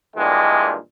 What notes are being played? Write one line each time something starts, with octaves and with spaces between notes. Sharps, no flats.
G2 A#2 D#3 E3 G#3